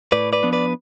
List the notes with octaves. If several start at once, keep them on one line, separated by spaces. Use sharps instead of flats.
A2 B4 D5
B4 D5
F3 B3 D4
B4 D5